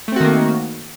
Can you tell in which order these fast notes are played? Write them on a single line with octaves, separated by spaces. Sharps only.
A3 C4 F#4 D#3 A#3